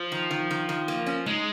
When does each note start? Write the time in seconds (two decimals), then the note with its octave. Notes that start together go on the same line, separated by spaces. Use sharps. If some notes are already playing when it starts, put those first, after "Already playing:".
Already playing: F3
0.12 D#3
0.31 D#3
0.51 D#3
0.69 D#3
0.88 A#3
1.06 C#4
1.26 G#3 D#4